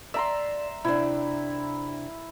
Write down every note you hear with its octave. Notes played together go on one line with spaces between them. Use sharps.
D5 E5 A#5 C6
C3 D4 E4